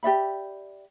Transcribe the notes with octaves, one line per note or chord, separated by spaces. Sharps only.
G4 D5 E5 B5